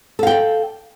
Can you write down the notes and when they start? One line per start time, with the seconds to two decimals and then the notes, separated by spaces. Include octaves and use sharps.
0.19 A4
0.23 F5
0.27 G5
0.31 D5